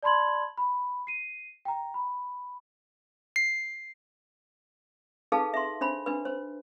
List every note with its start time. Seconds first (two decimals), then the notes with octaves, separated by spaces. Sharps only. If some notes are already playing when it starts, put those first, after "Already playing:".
0.03 D5 A5 B5 C6 G#6 F#7
0.57 B5
1.07 C7 D#7
1.65 G5 A#5
1.94 B5
3.36 C7
5.32 D#4 G#4 A4 B4 F5 A5
5.54 E5 C6
5.81 D4 C5 B5
6.06 D4 B4
6.25 C5